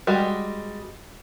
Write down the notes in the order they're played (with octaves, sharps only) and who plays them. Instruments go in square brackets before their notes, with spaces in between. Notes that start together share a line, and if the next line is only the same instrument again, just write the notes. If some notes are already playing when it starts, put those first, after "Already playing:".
[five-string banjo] G3 G#3 F#4 D#5